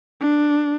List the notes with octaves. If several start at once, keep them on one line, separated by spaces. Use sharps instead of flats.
D4